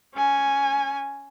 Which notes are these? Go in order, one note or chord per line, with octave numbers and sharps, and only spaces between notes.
C#4 G#5